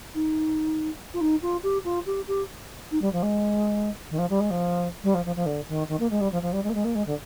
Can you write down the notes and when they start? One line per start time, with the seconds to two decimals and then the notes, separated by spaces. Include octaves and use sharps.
0.14 D#4
1.13 F4
1.20 D#4
1.42 F4
1.63 G4
1.84 F4
2.06 G4
2.27 G4
2.91 D#4
3.01 G3
3.12 F3
3.22 G#3
4.10 D#3
4.18 F3
4.29 G3
4.40 G#3
4.50 F3
5.03 G3
5.14 F3
5.25 F3
5.35 F3
5.45 D3
5.68 D#3
5.88 D#3
5.99 A#3
6.10 G#3
6.20 G3
6.31 F3
6.42 F3
6.52 G3
6.63 G#3
6.69 A#3
6.74 G#3
6.84 A#3
6.94 G#3
7.06 D3